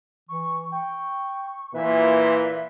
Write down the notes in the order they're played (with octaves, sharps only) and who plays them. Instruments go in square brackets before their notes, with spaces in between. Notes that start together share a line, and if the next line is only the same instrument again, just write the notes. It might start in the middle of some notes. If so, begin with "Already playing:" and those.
[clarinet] E3 [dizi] C#6
[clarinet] G5 [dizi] C#6
[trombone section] A#2 E3 [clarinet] B4 [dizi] E5